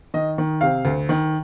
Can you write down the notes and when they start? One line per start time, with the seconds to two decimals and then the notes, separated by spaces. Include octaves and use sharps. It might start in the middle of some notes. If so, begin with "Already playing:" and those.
0.14 D#3 D#5
0.38 D#3
0.61 C3 F5
0.85 D2
1.09 D#3